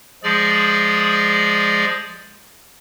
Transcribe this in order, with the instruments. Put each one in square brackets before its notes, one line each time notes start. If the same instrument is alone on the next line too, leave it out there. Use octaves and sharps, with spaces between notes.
[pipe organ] F3 G#3 G#4 D5